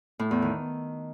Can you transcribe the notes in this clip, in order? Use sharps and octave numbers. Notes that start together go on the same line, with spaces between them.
A2
E2
D#3